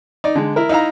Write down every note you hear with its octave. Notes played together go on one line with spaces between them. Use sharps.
D#4 D5
D3 G#3
E4 A#4
D#4 E4 E5 F5 A#5